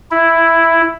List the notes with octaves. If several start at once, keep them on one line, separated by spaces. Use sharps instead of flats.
E4